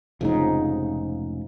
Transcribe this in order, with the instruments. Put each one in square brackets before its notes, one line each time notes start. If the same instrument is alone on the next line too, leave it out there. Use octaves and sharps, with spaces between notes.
[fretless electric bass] F1 G#2 C#3 [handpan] F3 D#4